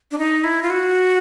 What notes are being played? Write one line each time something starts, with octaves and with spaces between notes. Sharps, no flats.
D4
D#4
E4
F4
F#4